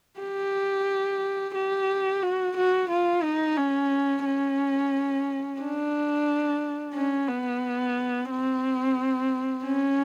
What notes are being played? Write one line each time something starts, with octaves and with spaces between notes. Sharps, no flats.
G4
G4
F#4
F#4
F4
D#4
C#4
C#4
D4
C#4
B3
C4
C#4